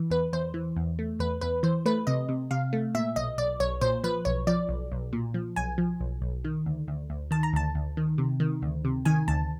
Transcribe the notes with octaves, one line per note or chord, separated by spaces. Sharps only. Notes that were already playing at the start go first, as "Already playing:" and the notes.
Already playing: E3
E2 B4
E2 C5
E3
E2
A3
E2 B4
E2 B4
E3 C5
A3 B4
C3 D#5
C3
C3 F5
A3
A#2 E5
B1 D#5
B1 D5
B1 C#5
A#2 C5
F3 B4
B1 C#5
F3 D5
B1
B1
A#2
F3
B1 G#5
F3
B1
B1
D#3
D2
D2
D2
D#3 A5
A#5
D2 A5
D2
D#3
C3
D#3
D2
C3
D#3 G#5
D2 A5